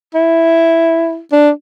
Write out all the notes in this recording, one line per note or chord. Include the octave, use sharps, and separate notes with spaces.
E4
D4